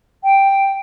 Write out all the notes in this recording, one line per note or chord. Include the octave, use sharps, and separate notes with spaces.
G5